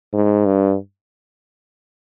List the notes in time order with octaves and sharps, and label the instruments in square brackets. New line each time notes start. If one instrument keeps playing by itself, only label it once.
[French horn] G#2
G2